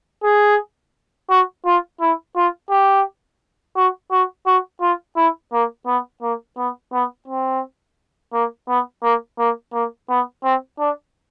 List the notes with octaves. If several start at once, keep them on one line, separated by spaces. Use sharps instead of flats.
G#4
F#4
F4
E4
F4
G4
F#4
F#4
F#4
F4
E4
A#3
B3
A#3
B3
B3
C4
A#3
B3
A#3
A#3
A#3
B3
C4
D4